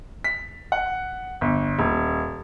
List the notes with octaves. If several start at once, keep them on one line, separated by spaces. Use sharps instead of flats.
B6
F#5
G1
D#1